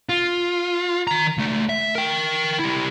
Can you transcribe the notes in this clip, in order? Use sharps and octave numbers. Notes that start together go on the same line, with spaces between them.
F4
D#3 A#5
C#2 A3
E5
A#4 G5
G3 E4